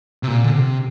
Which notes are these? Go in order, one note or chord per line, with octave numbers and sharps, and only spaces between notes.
C3
A#2
D3
C3